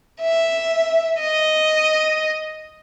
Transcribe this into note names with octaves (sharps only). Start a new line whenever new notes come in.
E5
D#5